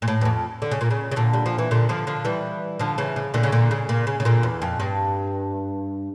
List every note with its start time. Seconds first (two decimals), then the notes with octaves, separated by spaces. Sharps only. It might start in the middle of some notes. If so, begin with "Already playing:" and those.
0.02 A#2
0.08 A2
0.21 E2
0.25 F2
0.62 D3
0.71 C#3
0.81 A#2
0.90 C#3
1.11 C#3
1.16 A#2 D3
1.33 G3
1.46 F3
1.58 E3
1.71 A#2 D3
1.89 D3 F3
2.07 D3 F3
2.25 E3 G3
2.79 D3 F3
2.98 C#3 E3
3.16 C#3
3.34 A#2 D3
3.43 C#3
3.52 A#2 D3
3.71 C#3
3.89 A#2
4.07 C#3
4.20 C#3
4.25 A#2 D3
4.43 E2
4.62 F2
4.80 G2